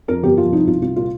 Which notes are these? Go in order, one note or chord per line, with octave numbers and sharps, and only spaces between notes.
F2 A#4
G1 G4
F3 F4
C2 D#4
C2 F4
C2 F4
A#2 F4